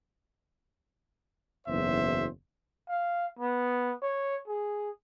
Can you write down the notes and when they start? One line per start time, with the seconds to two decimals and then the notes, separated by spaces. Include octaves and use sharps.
1.67 F#1 B1 E2 C5 E5
2.89 F5
3.39 B3
4.02 C#5
4.48 G#4